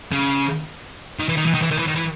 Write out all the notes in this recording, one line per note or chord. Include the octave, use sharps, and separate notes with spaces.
C#3
D#3
E3
D#3
E3
D#3
E3
D#3
E3
D#3
E3